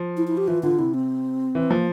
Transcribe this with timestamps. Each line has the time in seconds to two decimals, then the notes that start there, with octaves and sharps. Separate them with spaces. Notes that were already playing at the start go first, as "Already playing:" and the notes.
Already playing: F3
0.17 E4
0.28 E4
0.37 G4
0.48 E3 F4
0.63 D3 F4
0.78 C3 E4
0.94 C4
1.55 E3
1.71 F3 A#3